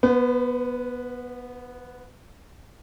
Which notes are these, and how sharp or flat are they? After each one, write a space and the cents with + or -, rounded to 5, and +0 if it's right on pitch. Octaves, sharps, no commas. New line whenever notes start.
B3 -15 B4 +40